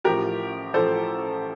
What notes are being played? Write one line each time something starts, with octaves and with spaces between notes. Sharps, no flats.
A1 A2 F3 G4 A#4
A1 A2 F3 A4 C5